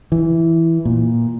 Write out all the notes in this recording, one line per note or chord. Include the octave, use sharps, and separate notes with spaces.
E3
A#2